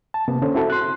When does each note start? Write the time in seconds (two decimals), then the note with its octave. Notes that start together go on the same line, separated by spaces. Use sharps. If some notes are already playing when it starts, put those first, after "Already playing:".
0.14 A5
0.28 C3 A#3 B3
0.42 D3 C#4 A4 C5
0.54 C4 E4 F#4 A4
0.70 C6 F#6